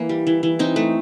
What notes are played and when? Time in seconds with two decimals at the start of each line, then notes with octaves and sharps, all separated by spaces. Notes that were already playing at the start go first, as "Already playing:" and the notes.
Already playing: E3 A#3
0.09 G3
0.27 E3
0.43 E3
0.59 C4 D#4
0.76 A3